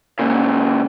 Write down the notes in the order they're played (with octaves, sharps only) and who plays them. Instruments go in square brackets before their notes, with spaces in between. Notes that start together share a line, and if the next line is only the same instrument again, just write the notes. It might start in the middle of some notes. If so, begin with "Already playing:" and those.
[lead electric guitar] A#2 C#3